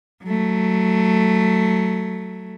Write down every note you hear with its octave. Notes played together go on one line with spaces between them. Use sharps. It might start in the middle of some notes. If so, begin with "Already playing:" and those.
F#3 A3